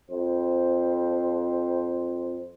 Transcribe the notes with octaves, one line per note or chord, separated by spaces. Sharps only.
F2 C5